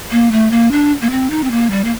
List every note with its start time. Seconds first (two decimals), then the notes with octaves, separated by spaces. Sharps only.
0.11 A#3
0.32 A3
0.51 A#3
0.72 D4
1.02 A#3
1.10 C4
1.30 D#4
1.44 C4
1.51 A#3
1.71 G3
1.84 A#3